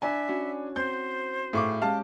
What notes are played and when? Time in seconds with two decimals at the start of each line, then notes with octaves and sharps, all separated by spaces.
0.02 D4 E4 E5 G#5
0.28 C#4 F#4
0.76 C4 C5 G6
1.53 A2 G#4 F5 C#6 D6
1.82 G#3 C#4 G4 F5 A5